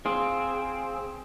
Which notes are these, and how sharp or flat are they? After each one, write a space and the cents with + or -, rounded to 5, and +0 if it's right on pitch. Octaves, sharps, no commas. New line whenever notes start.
C4 +0 F4 +0 G#4 +0